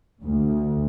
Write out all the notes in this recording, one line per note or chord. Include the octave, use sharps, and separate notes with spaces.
D2